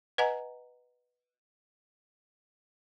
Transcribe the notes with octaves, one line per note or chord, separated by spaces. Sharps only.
B4 D#5 F#5 G#5 A#5